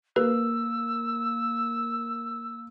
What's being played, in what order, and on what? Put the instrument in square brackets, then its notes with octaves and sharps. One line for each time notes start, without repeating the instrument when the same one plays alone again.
[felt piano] A#3 [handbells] B4 [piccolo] E6